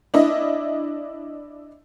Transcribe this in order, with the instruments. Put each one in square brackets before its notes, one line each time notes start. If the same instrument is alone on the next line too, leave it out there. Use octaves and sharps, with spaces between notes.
[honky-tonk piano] D4 E4 D#5